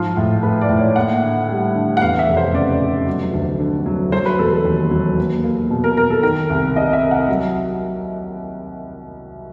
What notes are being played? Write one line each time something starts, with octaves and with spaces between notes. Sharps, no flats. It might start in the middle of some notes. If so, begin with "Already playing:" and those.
Already playing: G#2 F3 F4
A2
A3 B4
D5
A2
C#5
A#3 F#5
D3
G3
D3
F#5
E2 F5
E5
F1
C5
C#3 D5
F1
F#3
D2
D3
F#3
F#3 C5
B4
E1 A4
A4
D#2
F#3
A#3
A#3
B2
A#4
B2 A#4
A4
D#3 A#4
C2
C3 D#5
E5
C3
F#5
F#3 E5